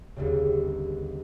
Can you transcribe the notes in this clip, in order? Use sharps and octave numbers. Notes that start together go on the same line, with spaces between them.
G1 D#2 C#3